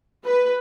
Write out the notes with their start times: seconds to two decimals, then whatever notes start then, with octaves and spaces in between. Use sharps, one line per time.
0.24 B4